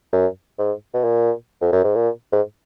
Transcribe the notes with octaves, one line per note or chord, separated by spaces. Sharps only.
F#2
G#2
B2
A#2
F2
F#2
G#2
A#2
G#2